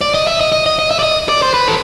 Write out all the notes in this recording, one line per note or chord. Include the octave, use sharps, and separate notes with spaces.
D5
D#5
E5
D#5
D#5
D#5
D#5
E5
D5
D#5
D5
C5
B4
A4